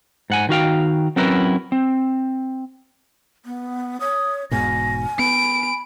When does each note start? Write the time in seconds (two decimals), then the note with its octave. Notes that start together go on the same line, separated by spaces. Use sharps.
0.30 G#2 F#5 G#5
0.49 D#3 F#4 F5 G5
1.16 F#3 C4 C#4 E4 A#4 B4
1.72 C4
3.45 B3
4.00 C#5 D#6
4.51 E1 G#2 B2 G#5 A#6
5.19 B3 B5 D7